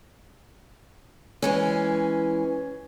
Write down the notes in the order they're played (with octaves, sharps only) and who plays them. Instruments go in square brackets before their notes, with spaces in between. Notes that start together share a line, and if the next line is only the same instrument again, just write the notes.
[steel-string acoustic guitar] E3 G#3 C#4